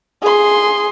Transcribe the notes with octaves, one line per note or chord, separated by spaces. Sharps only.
G#4 C6